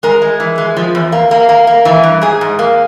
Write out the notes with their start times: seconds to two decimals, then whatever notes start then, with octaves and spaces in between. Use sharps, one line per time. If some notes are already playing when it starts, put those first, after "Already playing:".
0.03 G#3 A#4
0.22 G#3
0.40 E3
0.58 G#3
0.76 F3
0.95 E2
1.12 A#3
1.31 A#3
1.49 A#3
1.67 A#3
1.85 E3
2.03 G2
2.22 G#2 G#4
2.41 G#2
2.59 A#3